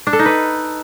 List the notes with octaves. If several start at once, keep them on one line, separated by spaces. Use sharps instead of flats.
D4
A4
D#4
B4